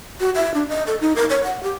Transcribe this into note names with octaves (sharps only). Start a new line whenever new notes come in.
F#4
E5
D4
D#5
A4
D#4
A#4
C#5
F#5
G4